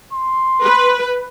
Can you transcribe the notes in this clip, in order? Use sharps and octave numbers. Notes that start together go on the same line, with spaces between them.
C6
B4